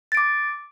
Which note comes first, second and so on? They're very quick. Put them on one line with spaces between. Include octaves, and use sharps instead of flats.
A6 D7 D6